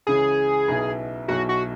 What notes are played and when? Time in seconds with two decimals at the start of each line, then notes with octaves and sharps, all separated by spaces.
0.07 C#2 C#3 E3 C#4 G#4
0.68 B1 B2 B3 E4
1.28 B1 B2 F#3 E4 F#4
1.49 F#4